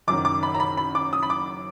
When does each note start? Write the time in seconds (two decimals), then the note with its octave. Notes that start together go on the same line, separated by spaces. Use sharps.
0.07 F#1 F#2 D#3 D6
0.25 D6
0.43 B5
0.54 A#5
0.60 B5
0.77 B5
0.95 D6
1.13 D#6
1.23 B5
1.30 D6